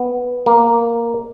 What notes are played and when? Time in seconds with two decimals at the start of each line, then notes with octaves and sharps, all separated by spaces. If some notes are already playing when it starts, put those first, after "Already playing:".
Already playing: B3
0.46 A#3